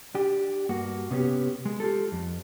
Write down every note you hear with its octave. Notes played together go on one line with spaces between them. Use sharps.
D4 G4
G2 A#3 F#4
C3 B3 C#4 G4
G#3
F4 G4 A4
F2